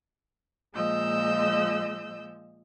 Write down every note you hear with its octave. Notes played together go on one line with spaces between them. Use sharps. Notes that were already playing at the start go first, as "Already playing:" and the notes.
A#2 F3 G#3 D#5 E6 G6